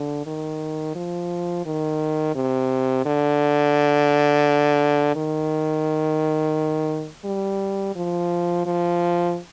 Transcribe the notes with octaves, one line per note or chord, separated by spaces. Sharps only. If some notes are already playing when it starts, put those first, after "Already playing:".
Already playing: D3
D#3
F3
D#3
C3
D3
D#3
G3
F3
F3